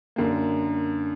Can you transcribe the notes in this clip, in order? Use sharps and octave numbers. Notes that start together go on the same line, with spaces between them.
F#2 D3 A#3